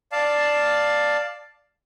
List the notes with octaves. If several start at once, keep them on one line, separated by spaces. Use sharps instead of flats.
D5 F5 A5